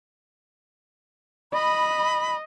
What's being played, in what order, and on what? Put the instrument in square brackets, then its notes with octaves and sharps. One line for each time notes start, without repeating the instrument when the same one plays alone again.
[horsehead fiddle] D#5 [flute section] B5